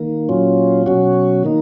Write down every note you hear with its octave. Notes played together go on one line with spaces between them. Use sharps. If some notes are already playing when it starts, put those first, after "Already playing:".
Already playing: D#3 A#3
A#2 F#3 C#4 F4
B2 F#3 C#4 F#4
D#3 A#3 D#4